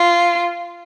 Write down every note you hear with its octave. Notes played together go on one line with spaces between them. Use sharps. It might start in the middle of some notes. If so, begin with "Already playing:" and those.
Already playing: F4